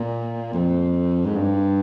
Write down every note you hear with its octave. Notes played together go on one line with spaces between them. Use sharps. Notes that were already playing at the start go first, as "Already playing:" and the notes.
Already playing: A#2
F2
G#2
G2